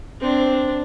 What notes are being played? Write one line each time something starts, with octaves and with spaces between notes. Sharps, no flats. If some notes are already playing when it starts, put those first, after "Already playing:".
C4 D4